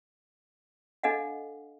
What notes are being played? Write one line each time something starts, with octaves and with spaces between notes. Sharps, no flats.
D4 A4 D#5 F5 F#5